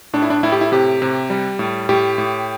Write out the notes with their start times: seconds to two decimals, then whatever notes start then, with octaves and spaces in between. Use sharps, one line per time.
0.13 A2 D4
0.22 E4
0.30 D4
0.43 A2 E4
0.52 G4
0.61 E4
0.72 C3 G4
1.02 C3
1.30 G3
1.59 A2
1.89 A2 G4
2.18 A2